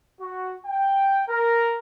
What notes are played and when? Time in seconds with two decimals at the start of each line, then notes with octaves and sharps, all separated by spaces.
0.21 F#4
0.66 G5
1.28 A#4